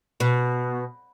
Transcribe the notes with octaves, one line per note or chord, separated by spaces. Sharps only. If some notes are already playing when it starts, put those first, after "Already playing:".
B2